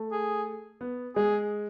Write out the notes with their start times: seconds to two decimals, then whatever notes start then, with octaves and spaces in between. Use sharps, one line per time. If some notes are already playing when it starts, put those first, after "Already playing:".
Already playing: A3
0.12 G#4
0.81 B3
1.16 G#3 G#4